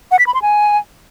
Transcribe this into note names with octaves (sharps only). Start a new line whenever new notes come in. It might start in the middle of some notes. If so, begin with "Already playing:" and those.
F#5
B6
B5
C6
G#5